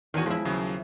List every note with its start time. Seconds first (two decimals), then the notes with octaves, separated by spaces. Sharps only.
0.14 E2 D#3 D#4 F#4 G#5
0.26 F3 G#3 E4 E5
0.45 D#2 C#3 F#3